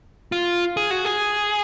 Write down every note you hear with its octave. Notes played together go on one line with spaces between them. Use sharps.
F4
G#4
F#4
G#4